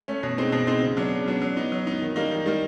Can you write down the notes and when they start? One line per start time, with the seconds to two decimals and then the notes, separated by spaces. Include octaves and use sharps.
0.08 A3 C#4
0.23 B2
0.38 G#3 C4 D#4
0.52 B2
0.67 G#3 C4 D#4
0.82 C#3
0.96 F#3 B3 D4
1.12 C#3
1.26 F#3 B3 D4
1.42 F#3
1.56 B3 D#4
1.72 F#3
1.87 B3 D#4
2.02 D#3
2.16 G3 A#3 D#4
2.31 D#3
2.46 G3 A#3 D#4